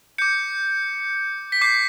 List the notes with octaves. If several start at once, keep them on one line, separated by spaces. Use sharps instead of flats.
D6 G6 C#7
B6
D6 G6 C7